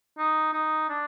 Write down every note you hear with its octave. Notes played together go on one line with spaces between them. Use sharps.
D#4
D#4
D4